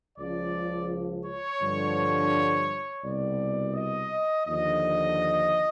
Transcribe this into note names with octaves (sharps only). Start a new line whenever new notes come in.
C#2 C#3 F3 D5
C#5
G2 D3 F3
C2 B2 D5
D#5
D#2 D3 F3 D#5